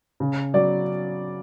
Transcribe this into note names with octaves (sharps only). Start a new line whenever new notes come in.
C#3
F#3 D5